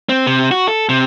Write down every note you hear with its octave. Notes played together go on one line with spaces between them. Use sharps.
C4
C3
F#4
A4
C3